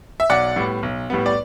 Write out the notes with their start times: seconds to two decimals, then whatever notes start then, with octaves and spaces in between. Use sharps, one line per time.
0.20 E5
0.30 B1 D5 F#5
0.56 A2 G3 B3
0.83 B1
1.10 A2 G3 B3
1.26 D5